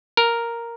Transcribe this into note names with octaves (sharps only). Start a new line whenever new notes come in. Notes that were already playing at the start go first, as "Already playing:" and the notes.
A#4